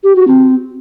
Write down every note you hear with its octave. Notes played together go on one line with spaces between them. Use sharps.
G4
F#4
C4